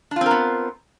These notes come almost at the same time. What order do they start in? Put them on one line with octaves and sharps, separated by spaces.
D4 F4 C4 A#4 B3